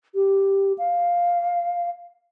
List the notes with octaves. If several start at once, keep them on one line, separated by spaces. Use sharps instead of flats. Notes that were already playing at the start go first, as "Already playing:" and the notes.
G4
F5